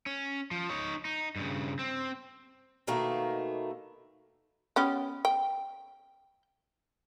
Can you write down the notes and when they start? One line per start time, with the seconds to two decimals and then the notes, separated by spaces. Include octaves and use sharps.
0.06 C#4
0.51 F3
0.70 D#4 C#5
1.05 D#4
1.36 G2 C#3
1.79 C4
2.87 B2 D#3 A3 A#3
4.76 B3 C#4 G4
5.25 G5